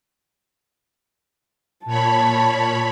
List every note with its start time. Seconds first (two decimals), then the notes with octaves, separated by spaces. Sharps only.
1.85 A#2 C#5 A5 B5